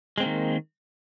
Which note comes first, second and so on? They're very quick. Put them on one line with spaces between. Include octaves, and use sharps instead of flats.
G#3 C4 A#3 D#3